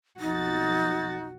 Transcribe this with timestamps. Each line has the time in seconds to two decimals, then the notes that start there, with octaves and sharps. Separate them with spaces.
0.20 B1 F2 D#4 F#4 A6